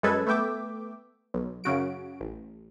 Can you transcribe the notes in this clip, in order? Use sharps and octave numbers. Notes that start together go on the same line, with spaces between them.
F#2 G#3 G#4 A4 B4 G#6
A3 B3 E5 G5 D6
B1
F#2 C#3 F#4 D7
A1